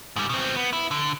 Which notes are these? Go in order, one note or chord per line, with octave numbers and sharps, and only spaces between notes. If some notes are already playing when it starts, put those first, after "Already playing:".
G#2 G3
B2 C4
B3
E4
D3